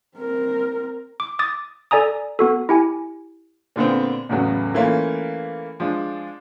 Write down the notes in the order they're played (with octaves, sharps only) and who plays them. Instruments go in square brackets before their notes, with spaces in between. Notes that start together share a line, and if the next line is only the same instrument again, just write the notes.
[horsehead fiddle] C4 A#4
[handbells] D6
D6 D#6 A6
A4 D5 G#5 A#5 D#6
B3 F#4 A4
E4 G4 G#5
[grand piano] A#2 D3 B3 C4
E2 A2 C#3 F#3 B3
E3 A3 A#3 C#4 F4
F3 G#3 D4